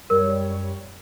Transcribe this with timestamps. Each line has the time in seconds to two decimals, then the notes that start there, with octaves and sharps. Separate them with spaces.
0.10 F#2 G3 A#4 C#5